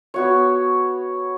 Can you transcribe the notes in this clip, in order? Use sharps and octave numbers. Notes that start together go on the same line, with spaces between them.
B3 F#4 C#5